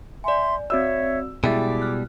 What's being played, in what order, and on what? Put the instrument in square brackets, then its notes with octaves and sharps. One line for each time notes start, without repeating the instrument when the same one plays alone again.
[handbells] D5 G#5 [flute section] E5 C6
[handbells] C4 F#4 D5 [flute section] C#5 E5 [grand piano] E6
[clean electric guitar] B2 G3 [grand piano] G#3 E4 [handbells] G5 A6 [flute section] D6
[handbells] F6 F#6